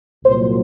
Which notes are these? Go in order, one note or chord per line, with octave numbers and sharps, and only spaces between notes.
C2 A#2 F#3 C5